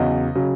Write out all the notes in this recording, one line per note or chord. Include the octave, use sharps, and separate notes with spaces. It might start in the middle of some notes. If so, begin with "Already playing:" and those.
Already playing: E2 C#3 F#3 D#5
C#3 F#3